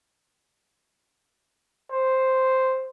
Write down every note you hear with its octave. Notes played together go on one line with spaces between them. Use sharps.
C5